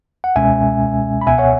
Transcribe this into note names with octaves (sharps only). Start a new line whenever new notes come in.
F#5
C#2 B2 G#3 C#4 E5 G#5
B5
C#2 B2 B3 E5 G#5
C#5 F#5